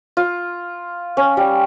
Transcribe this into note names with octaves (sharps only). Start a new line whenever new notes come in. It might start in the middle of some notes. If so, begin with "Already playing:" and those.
F4
C#4
G3